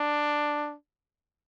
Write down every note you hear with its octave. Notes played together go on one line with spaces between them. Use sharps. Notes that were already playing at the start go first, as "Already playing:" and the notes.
Already playing: D4